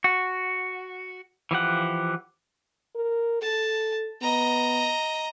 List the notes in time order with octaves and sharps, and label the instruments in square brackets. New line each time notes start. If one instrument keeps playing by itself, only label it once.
[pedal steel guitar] F#4
E3 F3 G4 F#5
[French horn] A#4
[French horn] A4 [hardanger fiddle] A5
[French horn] B3 [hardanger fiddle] D#5 A#5